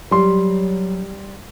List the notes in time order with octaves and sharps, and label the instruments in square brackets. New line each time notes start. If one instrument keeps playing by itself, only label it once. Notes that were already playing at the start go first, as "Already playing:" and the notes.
[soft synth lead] F#3 [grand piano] G3 C6